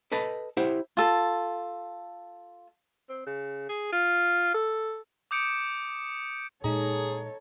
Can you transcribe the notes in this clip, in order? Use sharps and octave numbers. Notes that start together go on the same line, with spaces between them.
A4 B4 D#5 A5
E4 G4 C5 F#5
F4 A4
C4
C#3
G#4
F4
A4
D6 D#6 G6 C#7 D7
A#2 G#3 D#4 G#4 A4 C#5 A#5